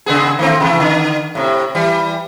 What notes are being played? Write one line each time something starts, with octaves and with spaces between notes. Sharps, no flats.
C#3 B3 G#4
D#3 A3 C4
C3 E3 A3
D3
A2 C3
E3 G3